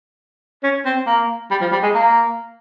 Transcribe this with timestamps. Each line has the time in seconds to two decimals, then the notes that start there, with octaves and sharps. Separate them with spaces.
0.63 C#4
0.85 C4
1.07 A#3
1.51 G3
1.61 F3
1.72 G3
1.83 G#3
1.94 A#3